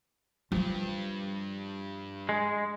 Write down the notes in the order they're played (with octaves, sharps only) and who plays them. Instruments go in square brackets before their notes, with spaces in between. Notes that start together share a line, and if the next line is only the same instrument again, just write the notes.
[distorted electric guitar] G2 [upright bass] F3 F4
[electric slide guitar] G#3